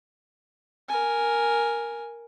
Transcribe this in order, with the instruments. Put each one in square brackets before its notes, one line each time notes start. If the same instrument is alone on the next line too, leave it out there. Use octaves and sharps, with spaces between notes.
[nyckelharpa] A#4 G#5